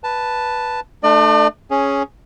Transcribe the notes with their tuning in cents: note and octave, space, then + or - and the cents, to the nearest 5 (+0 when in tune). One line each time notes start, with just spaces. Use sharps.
B4 -5 A5 +0
A3 +0 D4 +35 D5 +40
C#4 +0 G#4 +5